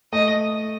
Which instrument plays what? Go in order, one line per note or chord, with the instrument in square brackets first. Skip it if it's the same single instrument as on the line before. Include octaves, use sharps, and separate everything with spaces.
[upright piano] A3 [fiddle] D#5